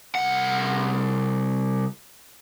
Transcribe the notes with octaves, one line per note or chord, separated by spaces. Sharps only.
C2 F#5